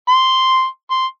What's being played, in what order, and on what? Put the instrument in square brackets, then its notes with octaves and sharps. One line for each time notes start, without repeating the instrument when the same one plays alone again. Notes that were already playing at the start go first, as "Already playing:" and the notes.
[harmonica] C6
C6